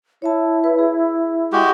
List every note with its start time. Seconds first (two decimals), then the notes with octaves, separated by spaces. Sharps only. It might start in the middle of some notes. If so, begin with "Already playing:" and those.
0.22 E4 C#5 E5 A5
0.64 B4
0.79 G#4
1.53 G#3 F#4 G4